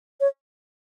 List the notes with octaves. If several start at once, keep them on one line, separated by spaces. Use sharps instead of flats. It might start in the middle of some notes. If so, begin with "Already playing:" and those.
C#5